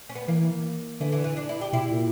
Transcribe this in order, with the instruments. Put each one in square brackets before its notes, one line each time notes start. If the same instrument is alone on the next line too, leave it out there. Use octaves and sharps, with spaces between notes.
[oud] C#4
B3
[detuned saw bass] E3 [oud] A#3
[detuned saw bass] D3 [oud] E3
[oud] E3
E3
D4
E4
G4
[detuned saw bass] B2 [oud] E4
[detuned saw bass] A#2